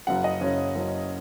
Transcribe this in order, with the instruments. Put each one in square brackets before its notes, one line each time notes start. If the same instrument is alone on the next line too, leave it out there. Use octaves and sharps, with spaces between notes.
[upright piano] F#1 F#2 C#3 F#5
D#5
F#1 F#2 C#3 C#4
F#1 F#2 C#3